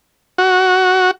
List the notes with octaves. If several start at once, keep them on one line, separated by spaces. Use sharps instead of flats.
F#4